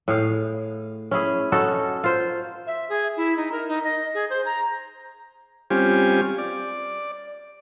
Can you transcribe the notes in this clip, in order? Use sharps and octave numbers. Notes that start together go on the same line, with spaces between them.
A2 G#4 F5
C#4 E4 G#4
C#4 D#4 F#4 A4
F4 C5
E5
G#4
E4
D#4
A#4
D#4
D#5
G#4
C5
A#5
G3 C4 C#4 F4 G4 G#5
D5